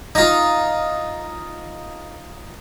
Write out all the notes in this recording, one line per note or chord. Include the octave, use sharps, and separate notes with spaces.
D#4 F4